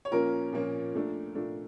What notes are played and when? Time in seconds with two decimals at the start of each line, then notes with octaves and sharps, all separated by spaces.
0.05 C#5
0.11 A#2 F3 A#3 C#4 A#4
0.53 A#2 F3 A#3 C#4
0.94 A#2 A3 D4
1.35 A#2 A3 D4